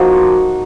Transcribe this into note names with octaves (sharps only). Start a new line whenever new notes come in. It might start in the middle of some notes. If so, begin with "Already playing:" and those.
Already playing: F3 A#3 D#4 F#4